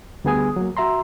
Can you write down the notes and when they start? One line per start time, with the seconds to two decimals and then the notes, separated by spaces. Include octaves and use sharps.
0.24 D2 G3 B3 G#4 G#5 D#6
0.56 F#3 A#3
0.77 F#4 E5 A#5 C6